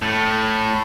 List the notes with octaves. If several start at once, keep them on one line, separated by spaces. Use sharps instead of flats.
A2